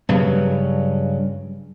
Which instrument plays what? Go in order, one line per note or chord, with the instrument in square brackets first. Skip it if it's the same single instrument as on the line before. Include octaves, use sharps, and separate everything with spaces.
[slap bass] G2 C#3 F#3